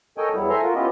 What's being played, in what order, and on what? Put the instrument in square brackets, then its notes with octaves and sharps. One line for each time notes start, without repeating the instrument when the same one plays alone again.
[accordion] A4 A#4 C#5 D#5 G5 G#5
E2 F#3 G3 B3 E4
A4 C5 E5 G#5 A#5 C6
F4 F#4 A#4
B3 C#4 E4 F4 G4 D#5